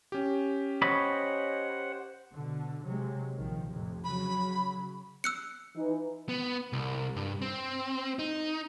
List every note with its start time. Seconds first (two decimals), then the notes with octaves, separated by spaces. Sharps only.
0.12 C#4 G4
0.82 C5 C#5 D#5 F#5 B5
2.34 B2 D3
2.85 C3 F#3 G#3
3.38 A#1 D#3 F3
3.69 F2 A2 C3
4.04 C#3 F#3 B5
5.24 E6 F#6 C#7
5.76 E3 D#4
6.29 B3
6.73 C2
7.16 G2
7.42 C4
8.19 D#4